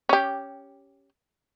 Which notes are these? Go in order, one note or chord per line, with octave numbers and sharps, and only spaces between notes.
C#4 G4